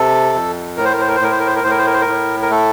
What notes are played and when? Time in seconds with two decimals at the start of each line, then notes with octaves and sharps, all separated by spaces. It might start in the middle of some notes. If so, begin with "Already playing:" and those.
Already playing: C3 A4
0.33 F2
0.77 A2 A#4
0.85 C5
0.93 A#4
1.01 C5
1.08 A#4
1.16 C5
1.20 A2 A#4
1.31 C5
1.40 A#4
1.47 C5
1.56 A#4
1.63 A2 C5
1.71 A#4
1.78 C5
1.86 A#4
1.94 C5
2.01 A#4
2.08 A2
2.42 A#4
2.51 A3 A4